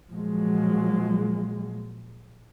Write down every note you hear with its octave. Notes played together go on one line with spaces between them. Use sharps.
A#2 F3 F#3 G#3